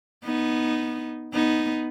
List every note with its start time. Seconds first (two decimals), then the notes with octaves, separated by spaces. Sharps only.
0.25 B3 D#4
1.34 B3 D#4